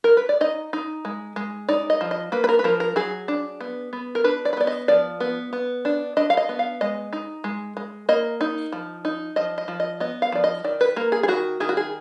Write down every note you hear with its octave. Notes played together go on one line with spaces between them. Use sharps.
A#4
B4
D5
D#4 D#5
D#4
G#3
G#3
D#4 D5
D#5
F3
D#5
A#3 B4
B4
A#4
B4
F3 A#4
A#4
F#3 G#4
D4
B3
B3
A#4
D4 B4
D5
B4
B3 D5
D#5
F3 D5
B3
B3
D4
D4 D#5
F5
D#5
B3
F5
G#3 D#5
D#4
G#3
G#3
A#3 D#5
D#4
F3
D#4
F3 D#5
D#5
F3
D#5
B3 D#5
F5
F3 D5
D#5
D#3 D5
B4
A#3 A#4
G#4
G#4
D#3 F#4
D#3 G#4
F#4
G#4